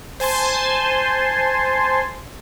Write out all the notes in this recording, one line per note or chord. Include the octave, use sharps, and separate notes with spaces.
C5 G#5 A5 C6